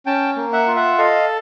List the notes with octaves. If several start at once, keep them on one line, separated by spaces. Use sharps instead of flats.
C#4 G5 A5
A#3
E5 F#5
F4
E5 F#5
A4 D#5 F5